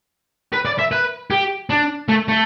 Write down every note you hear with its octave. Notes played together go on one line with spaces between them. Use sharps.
B4
D5
E5
B4
G4
D4
A3
A3